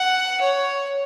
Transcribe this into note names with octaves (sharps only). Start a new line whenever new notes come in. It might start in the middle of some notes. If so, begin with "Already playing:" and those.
Already playing: F#5
C#5